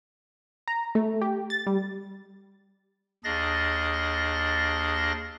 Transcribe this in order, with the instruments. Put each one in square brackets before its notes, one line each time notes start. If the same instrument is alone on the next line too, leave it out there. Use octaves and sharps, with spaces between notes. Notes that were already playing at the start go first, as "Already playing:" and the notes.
[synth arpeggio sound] A#5
A3
G4
A6
G3
[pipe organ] D#2 D4 G#4 D#5 A6 A#6